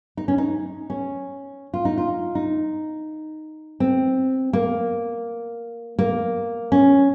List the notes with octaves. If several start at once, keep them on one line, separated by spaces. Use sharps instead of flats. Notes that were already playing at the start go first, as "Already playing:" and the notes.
D#4
C#4
D#4
C#4
F4
D#4
F4
D#4
C4
A#3
A#3
C#4